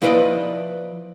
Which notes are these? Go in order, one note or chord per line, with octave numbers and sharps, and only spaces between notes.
F3 E4 B4 C5 D5 D#5